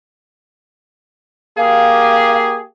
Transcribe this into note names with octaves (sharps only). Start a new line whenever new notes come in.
A#3 G4 G#4 F5